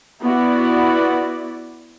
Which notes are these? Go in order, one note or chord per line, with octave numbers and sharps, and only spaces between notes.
B3 E4 F#4 D5